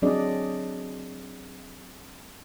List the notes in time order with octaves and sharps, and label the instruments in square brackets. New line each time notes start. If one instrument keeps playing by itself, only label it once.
[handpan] F#3 C4 D4 G#4 D5 D#5